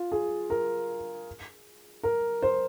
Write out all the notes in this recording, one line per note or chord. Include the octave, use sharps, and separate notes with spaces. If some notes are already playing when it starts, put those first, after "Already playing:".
Already playing: F4
G#4
A#4
A#4
C5